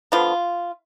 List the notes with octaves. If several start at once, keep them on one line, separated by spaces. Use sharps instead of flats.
D3 F3 B3 F4